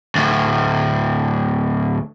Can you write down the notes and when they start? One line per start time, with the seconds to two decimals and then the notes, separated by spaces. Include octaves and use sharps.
0.15 D2 A2